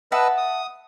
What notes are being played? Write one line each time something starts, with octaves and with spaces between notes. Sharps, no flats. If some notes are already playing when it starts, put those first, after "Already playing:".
B4 D#5 E5 F#5 A5 E6
D#6